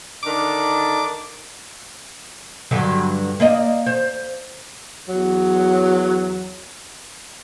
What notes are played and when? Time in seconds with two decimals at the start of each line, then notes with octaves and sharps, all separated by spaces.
0.23 D3 D#3 D4 D6
2.71 G2 D3 F#3
3.40 A#3 D5 D#5
3.86 C5
5.08 E2 F#3